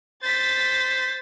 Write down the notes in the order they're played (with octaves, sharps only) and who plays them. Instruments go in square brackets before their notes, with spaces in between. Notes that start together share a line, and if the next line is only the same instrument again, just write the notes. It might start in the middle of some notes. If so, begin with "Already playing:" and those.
[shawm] C5 [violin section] A6 B6